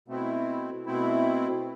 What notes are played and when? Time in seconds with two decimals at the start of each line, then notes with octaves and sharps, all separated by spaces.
0.08 B2 A3 C4 E4
0.86 B2 A3 C4 E4